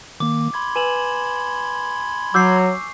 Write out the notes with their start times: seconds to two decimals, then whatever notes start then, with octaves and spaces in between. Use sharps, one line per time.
0.20 D#3 A#3 D6
0.54 B5 C6 G#6
0.76 B4 G#5 E7 F#7
2.34 F#3 C#6 D6 E6 G6 C7